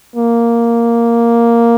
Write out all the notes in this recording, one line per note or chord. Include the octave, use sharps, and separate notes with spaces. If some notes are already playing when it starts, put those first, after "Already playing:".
A#3